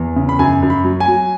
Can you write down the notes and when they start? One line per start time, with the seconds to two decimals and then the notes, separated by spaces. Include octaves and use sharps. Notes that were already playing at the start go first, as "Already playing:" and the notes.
Already playing: E2
0.16 C#3
0.29 B5
0.39 F#2 G#5
0.62 F#2
0.70 B5
0.84 F#3
1.00 G#5
1.08 F#3